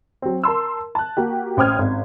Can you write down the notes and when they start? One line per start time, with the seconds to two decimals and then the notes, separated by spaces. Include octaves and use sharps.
0.22 F#3 C4
0.44 A#4 A5 C6 E6
0.95 A5 F#6
1.17 A#3 F#4 G4
1.57 A1 C5 G5 D#6 F6 G#6
1.79 G#1